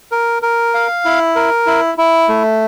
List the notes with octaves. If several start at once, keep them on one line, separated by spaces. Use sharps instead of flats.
A#4
A#4
F5
E4
A#4
E4
E4
A3